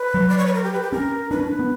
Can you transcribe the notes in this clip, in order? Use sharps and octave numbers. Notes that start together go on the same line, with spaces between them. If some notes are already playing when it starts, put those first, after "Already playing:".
Already playing: B4
F#3
D5
C#5
B4
A#4
G4
B4
G4
C#4 A#4
D4 B4
C#4
D4
B3